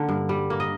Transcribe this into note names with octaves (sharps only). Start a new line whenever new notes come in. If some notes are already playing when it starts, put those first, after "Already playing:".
Already playing: D3 A#3
G2
G3
A#3
D#5